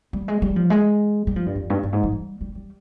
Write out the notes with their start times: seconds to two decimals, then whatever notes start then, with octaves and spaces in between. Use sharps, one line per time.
0.13 G3
0.28 G#3
0.42 G3
0.56 F3
0.70 G#3
1.27 G3
1.36 F3
1.46 G2
1.55 F2
1.70 G2
1.83 G2
1.93 G#2
2.03 F3
2.12 G3
2.41 G3
2.55 G3